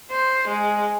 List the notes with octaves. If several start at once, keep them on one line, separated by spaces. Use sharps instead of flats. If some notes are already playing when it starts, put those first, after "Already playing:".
C5
G#3